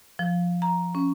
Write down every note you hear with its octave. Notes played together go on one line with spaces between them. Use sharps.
F3
A#5
C#4